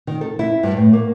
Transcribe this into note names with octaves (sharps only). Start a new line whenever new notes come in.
D#3
A4
E4
G2
A2
A#3